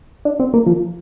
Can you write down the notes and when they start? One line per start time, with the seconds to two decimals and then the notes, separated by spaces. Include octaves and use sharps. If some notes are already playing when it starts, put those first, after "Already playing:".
0.25 D4
0.39 C4
0.54 A#3
0.66 F3